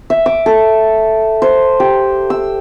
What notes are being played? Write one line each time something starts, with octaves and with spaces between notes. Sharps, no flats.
E5
D6
A4
C5
G4
E6